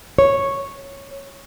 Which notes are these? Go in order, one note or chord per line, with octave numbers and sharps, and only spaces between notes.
C#5